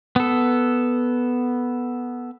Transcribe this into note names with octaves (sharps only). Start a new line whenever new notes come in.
B3 A4